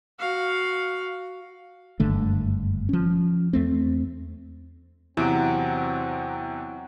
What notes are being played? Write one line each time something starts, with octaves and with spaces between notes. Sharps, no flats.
F#4 F5
F#1 G2 D3 A3
F3 C#4
E2 A3 C4
E2 C3 F#3 C4 E4 D7